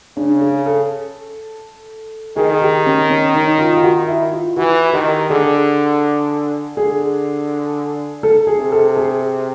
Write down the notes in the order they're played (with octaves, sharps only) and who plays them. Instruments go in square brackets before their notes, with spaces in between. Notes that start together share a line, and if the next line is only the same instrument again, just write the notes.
[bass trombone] C#3 [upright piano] D4
[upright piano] G#4
A4
[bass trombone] D#3 [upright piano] G#4
[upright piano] G4
C#4
C#4
D#4
F4
F4
F#4
E4
F4
[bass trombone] E3 [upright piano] F#4
[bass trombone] D#3 [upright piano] G4
[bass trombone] D3 [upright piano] G#4
[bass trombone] D3 [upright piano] G#4
[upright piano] A4
G#4
[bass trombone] C3
[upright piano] A4
G#4